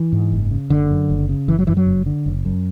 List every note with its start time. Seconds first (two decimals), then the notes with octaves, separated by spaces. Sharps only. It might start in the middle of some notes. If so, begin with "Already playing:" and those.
Already playing: E3
0.12 G#2
0.32 F#1
0.51 C#3
0.70 F#1 D3
0.91 F#2
1.10 F#1
1.29 C#3
1.48 F#1 E3
1.59 F#3
1.67 F#2 E3
1.77 F#3
1.86 F#1
2.06 D3
2.26 F#1
2.45 F#2